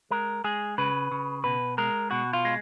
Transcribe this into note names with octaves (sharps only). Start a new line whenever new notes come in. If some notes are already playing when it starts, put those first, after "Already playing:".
G#3 A#4
G#3 G#4
C#3 B4
C#3
B2 B4
G#3 A#4
B2 F#4
F4
G#3